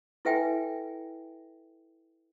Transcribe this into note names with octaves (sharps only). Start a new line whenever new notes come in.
E4 A4 B4 E5 G5 G#5